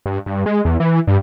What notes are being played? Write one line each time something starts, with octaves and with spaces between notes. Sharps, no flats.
G2
G2
G#3
E2
E3
G2